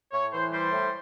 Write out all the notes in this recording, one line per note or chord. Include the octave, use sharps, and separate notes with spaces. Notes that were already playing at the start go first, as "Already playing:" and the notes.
A2 C#5
E3 C5
G3 C5
A2